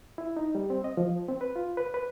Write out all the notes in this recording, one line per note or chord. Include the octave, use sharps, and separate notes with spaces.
E4
D#4
G3
C4
D#5
F3
C4
B4
F4
B4
B4